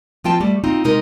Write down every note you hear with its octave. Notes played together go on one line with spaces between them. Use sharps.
F3 C4 F4 G5 A5
G3 A3
C4 D#4 F4
C3 G#3 D#4 A#4